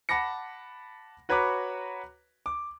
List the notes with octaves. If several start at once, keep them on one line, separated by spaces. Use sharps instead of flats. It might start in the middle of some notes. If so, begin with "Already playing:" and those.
F#5 A5 B5 D6 A#6 C#7
F#4 B4 C#5 A#5 B5 D6
D6